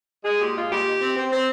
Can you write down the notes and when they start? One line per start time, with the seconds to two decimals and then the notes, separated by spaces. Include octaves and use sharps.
0.25 G#3 G#4
0.40 A#2 G4
0.55 G#3 F4
0.71 A#2 G4
0.86 D#3
1.01 C4
1.16 C4
1.31 C4 C5